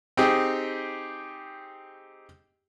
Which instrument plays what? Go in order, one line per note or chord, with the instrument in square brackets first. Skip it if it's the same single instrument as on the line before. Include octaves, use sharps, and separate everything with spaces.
[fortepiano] C4 D#4 G4 G#4